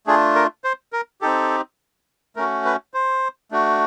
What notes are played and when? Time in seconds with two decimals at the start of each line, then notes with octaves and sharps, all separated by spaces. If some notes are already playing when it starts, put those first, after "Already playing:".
0.07 A3 D4 F4 G#4
0.35 A#4
0.64 C5
0.93 A#4
1.21 C4 D#4 G4 A4
2.36 A3 C#4 F#4 A#4
2.65 B4
2.94 C5
3.51 A3 D4 F#4